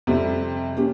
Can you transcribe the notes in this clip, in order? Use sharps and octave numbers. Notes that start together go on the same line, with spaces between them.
F2 C3 G3
A#3 C#4 G4